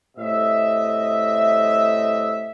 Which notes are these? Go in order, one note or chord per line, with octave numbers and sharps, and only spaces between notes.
A2 C3 D#5 E5